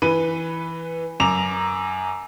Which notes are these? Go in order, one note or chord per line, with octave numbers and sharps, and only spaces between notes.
E3 B4 D#7
F#2 A#5 D6 F7